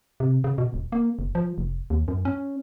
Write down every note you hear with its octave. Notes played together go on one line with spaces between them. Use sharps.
C3
C#3
B2
D#1
A#3
F#1
F3
F1
D#2
F#2
C#4